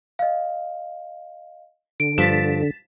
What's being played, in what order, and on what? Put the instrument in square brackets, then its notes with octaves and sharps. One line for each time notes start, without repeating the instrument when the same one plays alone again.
[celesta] D#5 F5
[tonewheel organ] D3 [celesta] D7
[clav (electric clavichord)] G2 F3 [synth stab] A6 B6 E7